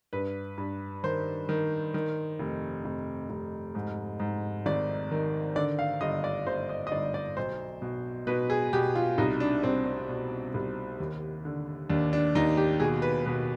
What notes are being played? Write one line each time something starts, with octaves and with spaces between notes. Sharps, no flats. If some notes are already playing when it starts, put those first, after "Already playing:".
G2 B4
G2
D#3 C5
D#3
D#3
F1
F1
F1
G#2
G#2
G#1 D5
D#3
D3 D5
F5
G1 D#5
D5
G1 C5
D#5
D#5
G1 D5
D5
B1 C5
B2
B2 B4
G#4
B2 G4
F4
C2 D#4
D4
C2 C4
C4
B2
C2
D#2
D3
D#2 D4
D4
D#2 D#4
G4
B2 G#4
B4
B2 B4